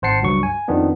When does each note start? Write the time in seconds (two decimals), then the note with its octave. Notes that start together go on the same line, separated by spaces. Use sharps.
0.02 G#1 C5 F#5 A5 C7 C#7
0.22 C#2 G2 F#3 C#6
0.43 G#5
0.68 F2 D#3 F3 B3 D4